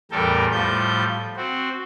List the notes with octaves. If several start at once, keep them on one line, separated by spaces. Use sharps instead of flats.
E2 A2 G3 A4 A#4 G5
A2 F3 G3 G6
C4 F#4